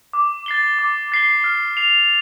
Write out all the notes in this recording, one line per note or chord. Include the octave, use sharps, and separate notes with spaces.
D6
A6 C7 G7
D6
A6 C7 G7
F6
C7 F7